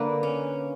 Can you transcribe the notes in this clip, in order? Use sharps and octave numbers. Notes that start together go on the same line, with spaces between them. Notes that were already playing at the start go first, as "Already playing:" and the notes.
Already playing: D3 A#3 B4
C#4